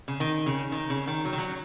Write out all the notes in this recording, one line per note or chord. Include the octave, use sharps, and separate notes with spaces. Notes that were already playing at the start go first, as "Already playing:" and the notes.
C#3
D#3
C#3
D#3
C#3
D#3
F#3
D#3
F#3